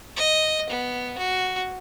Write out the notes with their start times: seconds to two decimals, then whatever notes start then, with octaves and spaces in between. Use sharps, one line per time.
0.16 D#5
0.70 B3
1.18 F#4